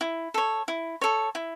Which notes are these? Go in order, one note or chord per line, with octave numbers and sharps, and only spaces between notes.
E4
A4 C#5
E4
A4 C#5
E4